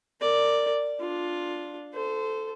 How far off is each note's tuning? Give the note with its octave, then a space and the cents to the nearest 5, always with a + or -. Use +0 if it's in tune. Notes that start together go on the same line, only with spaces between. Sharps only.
A#4 -20 D5 +0
D4 +0 F4 +5
A4 +0 C5 -20